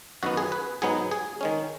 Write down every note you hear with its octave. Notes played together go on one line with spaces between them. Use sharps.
F#2 D#3 B3 F#4
G#4
B4
G#2 F#3 B3 D#4 G#4
G#4
D#3 G#3 C#4